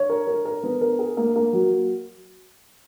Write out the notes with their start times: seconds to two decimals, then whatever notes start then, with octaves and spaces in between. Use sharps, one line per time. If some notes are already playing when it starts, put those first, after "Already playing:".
Already playing: C#5
0.09 A#4
0.27 A#4
0.45 A#4
0.63 B3
0.81 A#4
0.99 G#4
1.17 A#3
1.36 A#3
1.53 F#3